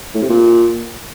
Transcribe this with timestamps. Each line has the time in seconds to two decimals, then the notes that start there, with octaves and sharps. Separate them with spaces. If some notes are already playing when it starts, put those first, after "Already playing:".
0.15 A2
0.22 C3
0.30 A#2